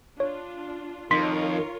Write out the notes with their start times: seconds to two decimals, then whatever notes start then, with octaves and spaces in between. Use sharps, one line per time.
0.20 D4 F4 C#5
1.11 F2 D#3 F4 A#4 C#5 C6 B6